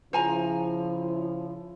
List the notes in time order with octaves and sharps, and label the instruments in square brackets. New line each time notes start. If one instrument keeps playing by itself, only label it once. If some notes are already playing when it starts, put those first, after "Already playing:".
[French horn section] C#3 F3 E4 [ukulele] C5 G#5 A#5